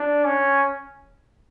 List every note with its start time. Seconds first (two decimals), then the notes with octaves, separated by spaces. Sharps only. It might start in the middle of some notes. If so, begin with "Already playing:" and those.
Already playing: D4
0.24 C#4